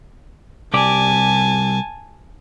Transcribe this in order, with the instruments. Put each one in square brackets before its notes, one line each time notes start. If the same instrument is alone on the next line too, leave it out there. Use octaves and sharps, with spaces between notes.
[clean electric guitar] C2 G4 D5 [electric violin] G#5 A5